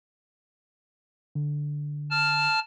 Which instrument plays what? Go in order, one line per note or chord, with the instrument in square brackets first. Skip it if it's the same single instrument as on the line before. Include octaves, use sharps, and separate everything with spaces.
[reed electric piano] D3
[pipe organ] A5 F6